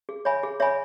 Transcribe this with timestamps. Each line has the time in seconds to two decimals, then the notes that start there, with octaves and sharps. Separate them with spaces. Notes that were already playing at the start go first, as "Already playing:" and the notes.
0.09 G#4
0.25 C#5 E5 G#5 B5
0.43 G#4
0.60 C#5 E5 G#5 B5